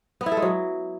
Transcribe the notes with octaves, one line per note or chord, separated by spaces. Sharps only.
B3
E4
A4
G#3
F#3